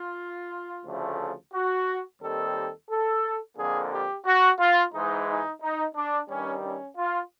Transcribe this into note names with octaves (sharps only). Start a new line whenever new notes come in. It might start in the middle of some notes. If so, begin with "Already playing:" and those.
Already playing: F4
D2 C#3 F3 A3
F#4
D#2 D#3 G3 C4 A4
A4
F2 D3 F3 A#3 G#4
G4
F#4
F4
G#2 E3 G#3 D#4
D#4
D#4
D4
G2 D#3 G3 C#4
C#4
F4